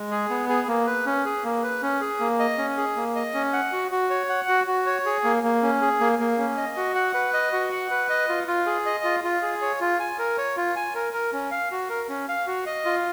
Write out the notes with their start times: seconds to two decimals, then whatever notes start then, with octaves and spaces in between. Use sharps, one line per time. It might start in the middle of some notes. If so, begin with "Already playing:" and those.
Already playing: G#3
0.11 G#4
0.30 B3
0.49 G#4
0.68 A#3
0.87 B4
1.06 C#4
1.25 G#4
1.44 A#3
1.63 B4
1.82 C#4
2.01 G#4
2.20 A#3
2.39 D#5
2.58 C#4
2.77 G#4
2.96 A#3
3.15 D#5
3.34 C#4
3.53 F#5
3.72 F#4
3.92 F#4
4.10 C#5
4.29 F#5
4.48 F#4
4.67 F#4
4.86 C#5
5.06 G#4
5.24 A#3
5.43 A#3
5.62 C#4
5.81 G#4
6.00 A#3
6.19 A#3
6.38 C#4
6.57 D#5
6.77 F#4
6.95 F#5
7.14 B4
7.34 D#5
7.53 F#4
7.72 F#5
7.90 B4
8.09 D#5
8.29 F4
8.47 F4
8.66 G#4
8.86 D#5
9.04 F4
9.24 F4
9.42 G#4
9.61 C#5
9.81 F4
10.00 G#5
10.19 A#4
10.38 C#5
10.57 F4
10.76 G#5
10.95 A#4
11.13 A#4
11.33 C#4
11.51 F5
11.71 F#4
11.89 A#4
12.09 C#4
12.28 F5
12.47 F#4
12.66 D#5
12.85 F4